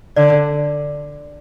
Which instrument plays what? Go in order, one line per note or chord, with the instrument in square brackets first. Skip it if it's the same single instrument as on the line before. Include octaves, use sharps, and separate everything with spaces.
[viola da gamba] D3 [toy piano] D5